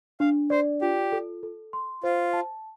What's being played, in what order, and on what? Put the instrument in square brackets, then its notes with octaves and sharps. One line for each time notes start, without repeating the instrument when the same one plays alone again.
[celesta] D4 [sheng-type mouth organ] F5
[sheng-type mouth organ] C5 [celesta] D5
[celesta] F4 [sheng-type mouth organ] G4
[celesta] A4
A4
C6
[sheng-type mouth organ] F4 [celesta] C5
[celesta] A5